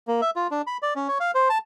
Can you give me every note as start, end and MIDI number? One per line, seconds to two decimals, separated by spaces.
0.08 0.21 58
0.21 0.30 76
0.36 0.47 65
0.51 0.62 62
0.67 0.77 83
0.82 0.94 74
0.96 1.08 61
1.08 1.18 73
1.20 1.31 77
1.35 1.49 72
1.49 1.58 81